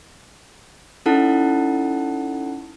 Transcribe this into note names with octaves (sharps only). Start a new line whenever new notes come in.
C#4 D#4 E4 A4 F#5 A5